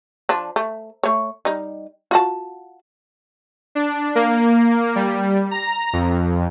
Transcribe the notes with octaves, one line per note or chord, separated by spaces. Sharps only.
F3 D4
A3
A3 C#5
G3 D#4
F4 F#4 A5
D4
A#3
G3
A#5
F2